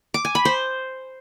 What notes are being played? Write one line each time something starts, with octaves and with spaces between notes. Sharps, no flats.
D6
G#5
B5
C5